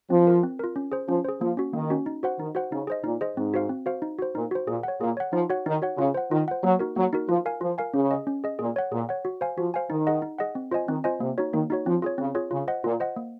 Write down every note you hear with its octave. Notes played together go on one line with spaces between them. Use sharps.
F3 C4
F4 A#4
C4
F4 A#4
C#4
G#4 C5
F3 C#4
G#4 C5
F3 A#3
C#4 F#4
D#3 A#3
C#4 F#4
D#4
F#4 C5 F#5
D#3 D#4
F#4 C5 F#5
C#3 D#4
G#4 C5 D#5
A#2 D#4
G#4 C5 D#5
G#2 C4
F#4 C5 F5
C4
F#4 C5 F5
D#4
F#4 C5
A#2 D#4
F#4 C5
A#2 G#4
C#5 F#5
A#2 G#4
C#5 F#5
F3 D#4
F#4 C#5 F#5
D#3 D#4
F#4 C#5 F#5
C#3 F4
C5 F#5
D#3 F4
C5 F#5
F#3 A#3
D#4 F#4 A#4
F#3 A#3
D#4 F#4 A#4
F3 F4
A#4 F5 G#5
F3 F4
A#4 F5 G#5
C#3 C#4
G#4 D#5
C#4
G#4 D#5
A#2 G#4
C#5 F#5
A#2 G#4
C#5 F#5
F#4
C5 F5 G#5
F3 F#4
C5 F5 G#5
D#3 D#4
G#4 D#5 F#5
D#4
G#4 D#5 F#5
C4
F4 C5 D#5 G#5
D#3 C4
F4 C5 D#5 G#5
C3 A#3
D#4 F#4 C#5
D#3 A#3
D#4 F#4 C#5
F3 C4
F4 G#4 C#5
C#3 C4
F4 G#4 C#5
C#3 F4
C5 D#5 F#5
A#2 F4
C5 D#5 F#5
A#3